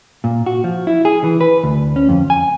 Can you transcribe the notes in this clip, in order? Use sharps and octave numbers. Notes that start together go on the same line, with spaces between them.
A#2
F#4
F3
E4
G#4
E3
B4
D2
C#4
F2
G#5